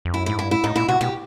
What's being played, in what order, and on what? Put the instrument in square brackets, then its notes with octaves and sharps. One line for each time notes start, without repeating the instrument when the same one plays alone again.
[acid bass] F2
[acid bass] F#2 [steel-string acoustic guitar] E4
[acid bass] G#2 [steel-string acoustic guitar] E4
[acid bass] G2 [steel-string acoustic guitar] E4
[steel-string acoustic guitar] E4
[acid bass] A2 [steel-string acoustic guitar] D#4
[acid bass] A#2 [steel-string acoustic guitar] E4
[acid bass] C3 [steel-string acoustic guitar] F#4
[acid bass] B2 [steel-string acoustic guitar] G4